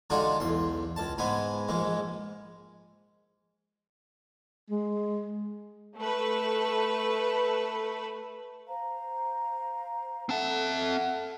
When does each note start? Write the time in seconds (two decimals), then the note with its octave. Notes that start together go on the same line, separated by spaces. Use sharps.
0.10 D3 G#3 D4 D#4 F4 F#4
0.40 B1 E2 C6
0.96 C#2 A5
1.18 G#2 G#3 B3 G#5
1.69 A#1 G#2 G#3
4.70 G#3
5.98 A3 B4
8.68 C5 F5 A#5
10.29 C4 A4 E5 F#5 A5